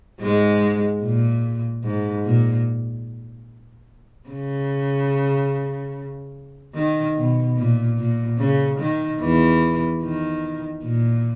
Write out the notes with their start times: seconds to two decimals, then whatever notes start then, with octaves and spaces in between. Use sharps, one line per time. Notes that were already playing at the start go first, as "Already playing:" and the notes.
0.20 G#2 G#3
1.02 A#2
1.84 G#2
2.25 A#2
4.30 C#3
6.74 D#3
7.16 B2
7.57 A#2
7.97 A#2
8.38 C#3
8.79 D#3
9.20 E2 E3
10.02 D#3
10.84 A#2